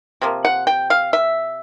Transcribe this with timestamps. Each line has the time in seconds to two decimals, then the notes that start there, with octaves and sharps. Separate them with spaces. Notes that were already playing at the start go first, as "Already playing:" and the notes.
0.22 C3 F3 A#3
0.45 F#5
0.67 G5
0.90 F5
1.13 E5